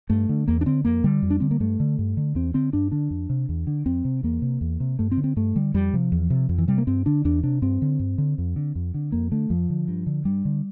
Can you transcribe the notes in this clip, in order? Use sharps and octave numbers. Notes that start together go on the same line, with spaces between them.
G2 A3
D3
E2 A#3
D4
D3 C4
F2 A#3
D3 G3
F2
D4
D3 C4
A#3
G2 A3
D3
G2
D3
E2 C4
D3 C4
G2 D4
D3 D4
F2
C3
E2
D3
F2 C4
C3
E2 A#3
C3
E2
C3
G2 A3
C4
D3
C4
G2 A3
D3 G3
F2 G3
C3 F3
E2
C3
F2
E3
C3 G3
A#3
G2 C4
D3 D4
E2 D4
C3 D4
G2 C4
D3
G2
D3
F2
D3
F2
D3
F2 A#3
D3 A3
F2 F3
D3
G2
D3
G2 G3
D3